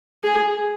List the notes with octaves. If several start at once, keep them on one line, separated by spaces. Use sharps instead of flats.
G#4